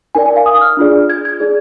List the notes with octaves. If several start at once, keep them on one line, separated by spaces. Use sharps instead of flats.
D#4 A#4 D5 G#5
G#5
F5
D#6
F6
D4 F4 G#4 D5
G#6
G#6
D#4 G#4 D5